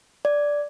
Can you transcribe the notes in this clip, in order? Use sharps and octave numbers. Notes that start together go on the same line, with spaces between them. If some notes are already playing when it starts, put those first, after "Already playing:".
D5